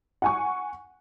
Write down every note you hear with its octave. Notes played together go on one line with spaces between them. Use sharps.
F#5 G#5 C#6